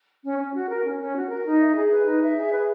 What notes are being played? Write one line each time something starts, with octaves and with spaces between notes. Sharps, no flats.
C#4
C#4
F#4
A#4
C#4
C#4
F#4
A#4
D#4
E5
G#4
B4
D#4
E5
G#4
B4